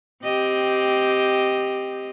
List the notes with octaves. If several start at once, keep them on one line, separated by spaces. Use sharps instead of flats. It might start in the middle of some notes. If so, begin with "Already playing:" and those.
C4 G4 D#5